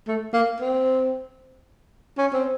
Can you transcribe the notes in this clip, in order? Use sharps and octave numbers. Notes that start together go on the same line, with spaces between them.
A3
A#3
C4
C#4
C4